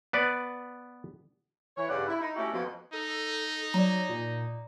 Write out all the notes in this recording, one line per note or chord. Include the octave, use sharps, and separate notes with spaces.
B3 B4 D5
E3 C#5
G2 C#3 G3 D5 F#5
E4
D#4
A3 C#4 E4 F#4 G4
F2 B2
D#4 A4
F#3 D5 A#5
A#2